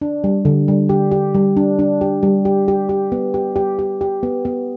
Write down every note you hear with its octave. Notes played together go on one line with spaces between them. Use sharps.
D4
G3
D3
G3
G4
G4
G3
D4
D4
G4
G3
G4
G4
G4
B3
G4
G4
G4
G4
B3
B3